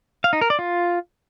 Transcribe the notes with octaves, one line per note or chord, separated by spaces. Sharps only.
F5
D#4
A#4
D5
F4